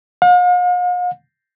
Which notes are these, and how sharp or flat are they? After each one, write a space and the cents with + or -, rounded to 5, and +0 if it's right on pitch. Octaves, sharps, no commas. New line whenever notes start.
F5 +45